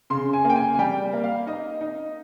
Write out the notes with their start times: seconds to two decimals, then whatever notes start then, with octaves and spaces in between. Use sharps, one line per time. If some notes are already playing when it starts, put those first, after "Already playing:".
0.10 C#3 C6
0.33 G#5
0.44 A#3
0.50 G5
0.56 G#5
0.74 G#5
0.79 G3 G5
1.13 A#3
1.24 F5
1.47 D#4 D#5
1.81 D#4